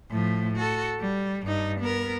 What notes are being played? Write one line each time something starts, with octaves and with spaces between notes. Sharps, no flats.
A2 F3
F#4 A4
G3
G2 D#4
B3 A#4